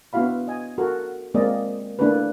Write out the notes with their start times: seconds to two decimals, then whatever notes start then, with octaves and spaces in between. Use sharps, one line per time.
0.13 B3 D4 E4 F#4 F5 B5
0.48 D#5 G#5
0.78 F#4 A4 A#4
1.34 G#3 A#3 C4 G#4 D5 D#5
1.99 A3 A#3 D4 E4 A4 B4